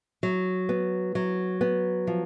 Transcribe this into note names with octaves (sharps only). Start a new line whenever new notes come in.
F#3
B3
F#3
B3
F3